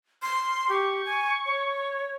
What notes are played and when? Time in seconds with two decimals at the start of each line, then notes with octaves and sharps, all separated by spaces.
0.22 C6 F6
0.69 G4 C#6
1.05 G#5
1.46 C#5